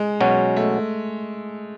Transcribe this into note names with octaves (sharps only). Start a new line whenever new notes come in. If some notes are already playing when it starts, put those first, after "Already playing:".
Already playing: G#3
B2 F#3 C#4
A3